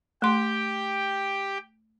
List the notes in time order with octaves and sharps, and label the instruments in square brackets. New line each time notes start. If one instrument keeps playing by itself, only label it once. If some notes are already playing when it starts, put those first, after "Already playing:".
[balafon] A3 C6 [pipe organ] G4 G5